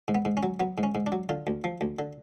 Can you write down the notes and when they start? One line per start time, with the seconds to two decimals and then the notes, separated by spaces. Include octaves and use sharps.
0.08 G#2
0.15 B3
0.25 G#2
0.37 C#4
0.43 F#3
0.60 F#3 B3
0.78 G#2
0.83 C#4
0.95 G#2
1.07 D4
1.12 F#3
1.29 D3 F4
1.47 D2
1.64 F3
1.81 D2
1.99 D3